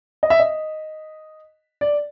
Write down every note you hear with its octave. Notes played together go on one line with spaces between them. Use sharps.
D#5
E5
D#5
D5